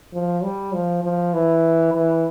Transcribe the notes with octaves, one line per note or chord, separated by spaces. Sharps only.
F3
G3
F3
F3
E3
E3